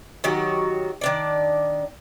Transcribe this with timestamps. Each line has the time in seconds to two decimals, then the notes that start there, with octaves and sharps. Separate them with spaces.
0.24 D#3 F#3 F#4 G4
1.01 D#3 D4 D5